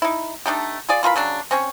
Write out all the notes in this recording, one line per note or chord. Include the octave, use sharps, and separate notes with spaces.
D#4 E4
A3 D4 D#4 G4
F4 G#4 D5
E3 F4 A#4 B5
C#3 F#3 D4
C4 C#4 C#5